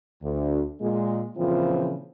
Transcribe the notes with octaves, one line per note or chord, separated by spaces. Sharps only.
D2
A#2 G#3
A#2 C#3 E3 F3 C4